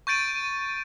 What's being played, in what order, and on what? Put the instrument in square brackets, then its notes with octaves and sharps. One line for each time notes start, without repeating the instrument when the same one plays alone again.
[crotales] C#6 G6 A6 D7 D#7